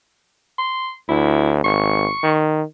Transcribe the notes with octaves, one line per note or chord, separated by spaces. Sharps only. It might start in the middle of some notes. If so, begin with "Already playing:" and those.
C6
D2 E4
G#1 C#6
D#3